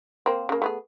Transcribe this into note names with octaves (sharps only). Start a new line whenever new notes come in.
A#3 C4
C#3 A#3
A3 B3 G#4